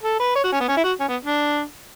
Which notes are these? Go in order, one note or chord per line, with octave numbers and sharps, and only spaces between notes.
A4
B4
C#5
F#4
C#4
B3
C#4
E4
F#4
C#4
B3
D4